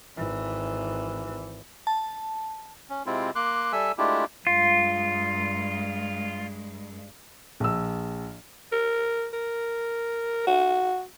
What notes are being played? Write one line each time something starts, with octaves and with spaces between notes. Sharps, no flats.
G#1 E3
A5
C#4
C3 G#3 C4 E4 F4
A#3 C6 D6 F#6
G3 A4 E5 G#5 E6
G#3 A3 D4 E4 F4 G4
G2 G#3 F4
A#1 E6
A#4
A#4
F#4